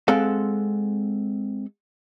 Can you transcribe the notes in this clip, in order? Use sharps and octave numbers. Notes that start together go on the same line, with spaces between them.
G#3 C4 A4 F5 F#5